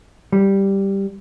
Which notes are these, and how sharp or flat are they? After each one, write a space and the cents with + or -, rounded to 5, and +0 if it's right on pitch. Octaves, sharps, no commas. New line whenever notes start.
G3 +0